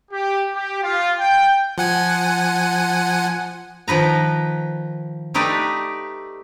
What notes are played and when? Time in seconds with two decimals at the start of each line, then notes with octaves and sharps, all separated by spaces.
0.11 G4
0.54 G4
0.83 F4
1.18 G5
1.78 F3 F#5 G#5
3.88 D#3 F3 B4 A#5
5.34 A3 D#4 G4 B4 D5